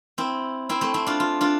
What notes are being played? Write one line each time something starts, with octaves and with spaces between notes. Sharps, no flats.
C4 E4
C4 E4
A3 C4
C4 E4
D4 F4
F4
D4 F4